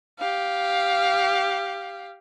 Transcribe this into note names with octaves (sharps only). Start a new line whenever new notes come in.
G4 F5